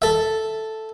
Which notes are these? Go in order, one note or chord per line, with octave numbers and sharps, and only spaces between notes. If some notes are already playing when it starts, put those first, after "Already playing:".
A4 E5